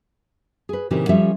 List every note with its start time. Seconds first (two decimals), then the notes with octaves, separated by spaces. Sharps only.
0.69 G#4 B4
0.91 A#2 C#3 E3 C4 D#4 G4
1.09 F3 G3 C#4 A4 E5